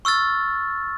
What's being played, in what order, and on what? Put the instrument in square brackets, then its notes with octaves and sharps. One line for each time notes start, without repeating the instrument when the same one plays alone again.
[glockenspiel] C#6 E6 F6 A6